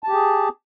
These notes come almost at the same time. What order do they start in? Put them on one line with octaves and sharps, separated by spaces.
A5 G4 G#4